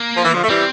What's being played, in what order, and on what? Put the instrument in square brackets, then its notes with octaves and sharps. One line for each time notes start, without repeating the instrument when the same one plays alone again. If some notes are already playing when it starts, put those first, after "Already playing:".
Already playing: [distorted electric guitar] A#3
[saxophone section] F3
E3
D3 F3
A3
[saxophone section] E3 G3 [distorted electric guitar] C4